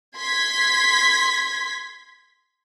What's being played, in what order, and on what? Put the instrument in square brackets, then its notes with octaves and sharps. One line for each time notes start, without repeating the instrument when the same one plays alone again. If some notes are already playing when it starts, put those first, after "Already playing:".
[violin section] C6 G#6 B6